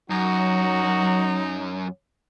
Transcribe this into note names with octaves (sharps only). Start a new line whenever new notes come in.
F#2 F#3 D#4 F#4